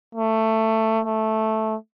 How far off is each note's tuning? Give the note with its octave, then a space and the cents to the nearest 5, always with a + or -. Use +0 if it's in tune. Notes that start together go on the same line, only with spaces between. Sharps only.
A3 +15
A3 -5